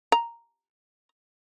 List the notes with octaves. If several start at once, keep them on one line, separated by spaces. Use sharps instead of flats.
A#5